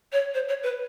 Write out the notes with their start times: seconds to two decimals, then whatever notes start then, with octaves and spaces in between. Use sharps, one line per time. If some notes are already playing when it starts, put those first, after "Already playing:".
0.12 C#5
0.34 C5
0.48 C#5
0.63 B4